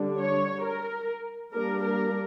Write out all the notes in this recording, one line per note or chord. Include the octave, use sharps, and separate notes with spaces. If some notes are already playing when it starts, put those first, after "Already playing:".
Already playing: D3 G3 D4
C#5
A#4
G3 A#3 D4 A#4
A#4